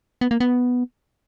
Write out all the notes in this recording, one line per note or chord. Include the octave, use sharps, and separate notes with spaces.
B3
A#3
B3